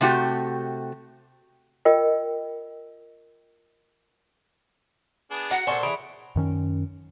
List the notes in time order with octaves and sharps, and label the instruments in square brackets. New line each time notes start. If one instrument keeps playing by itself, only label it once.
[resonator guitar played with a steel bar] C3 A3 F#4 G4
[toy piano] F4 A#4 D#5 G5
[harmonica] B3 D4 G#4
[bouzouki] F#4 A#5 [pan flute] F#5
[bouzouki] A#2 C#3 G#5 [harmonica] A4 C5 [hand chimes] D5 C#6
[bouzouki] E3 G#4 [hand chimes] B5 D7
[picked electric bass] F#2 D#3 C#4